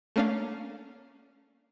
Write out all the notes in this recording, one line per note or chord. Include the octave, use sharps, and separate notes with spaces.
A3 A#3 C#4 D4 F5